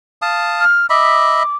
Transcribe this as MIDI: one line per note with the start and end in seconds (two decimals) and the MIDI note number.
0.22 0.65 77
0.22 0.65 81
0.22 0.65 87
0.60 0.86 89
0.90 1.43 75
0.90 1.43 76
0.90 1.43 83
0.90 1.56 86